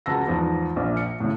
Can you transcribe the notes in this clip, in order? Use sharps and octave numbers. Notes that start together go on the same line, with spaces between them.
C#2 G#3 F#4 A5 E6 A#6
E2 G#2 F3
A#1 A#2
C#7
A2 C#3